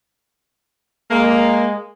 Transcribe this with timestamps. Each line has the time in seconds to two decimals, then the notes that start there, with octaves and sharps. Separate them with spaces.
1.11 G#3 A#3